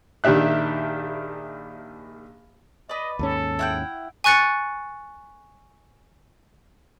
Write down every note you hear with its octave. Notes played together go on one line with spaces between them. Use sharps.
A#1 D#3 D4 G4 E5 F#6
B4 D5 D#5
D#2 G#2 C#4 A4
E4 F#5 G5
G#5 C#6 F#6 A6 C#7